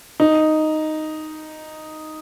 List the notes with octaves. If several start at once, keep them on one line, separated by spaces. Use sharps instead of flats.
D#4